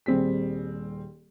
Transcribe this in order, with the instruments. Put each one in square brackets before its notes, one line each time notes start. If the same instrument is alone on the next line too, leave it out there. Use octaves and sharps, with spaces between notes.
[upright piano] D#1 G3 C4 G#4 B6